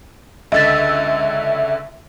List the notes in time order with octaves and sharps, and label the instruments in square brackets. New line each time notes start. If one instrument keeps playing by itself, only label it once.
[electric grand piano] C#2 D3 [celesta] D#5 A6 [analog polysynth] E5